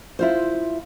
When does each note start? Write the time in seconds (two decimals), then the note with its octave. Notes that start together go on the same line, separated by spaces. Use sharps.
0.19 E4 F4 C5